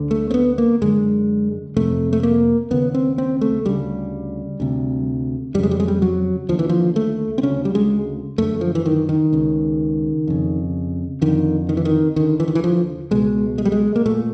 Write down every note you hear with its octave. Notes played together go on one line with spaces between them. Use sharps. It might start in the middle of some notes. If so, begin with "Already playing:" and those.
Already playing: D2 D3
A3
C4
B3
A#3
F#2 D3 G#3
F2 C3 A3
A3
A#3
D#2 C#3 B3
C4
C4
A3
D2 C#3 G3
D2 C3
F2 C#3 G3 G#3
G3
G#3
G3
F#3
D#2 D3 F3
E3
F3
A3
C4
D2 C#3 C#4
G3
G#3
F#2 D3 A3
F3
E3
D#3
D#3
C#2 C#3
F2 C#3
F2 D3 D#3
D#3
E3
D#3
D#2 D3 D#3
E3
D#3
E3
F3
C#2 B2 G#3
G#3
G3
G#3
A#3
A#2 A3